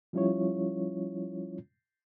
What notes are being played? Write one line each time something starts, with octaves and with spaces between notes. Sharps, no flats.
F3 G3 C#4 E4 F4 C#5